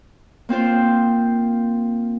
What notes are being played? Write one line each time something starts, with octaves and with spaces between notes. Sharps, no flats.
A#3 C4 F4 C5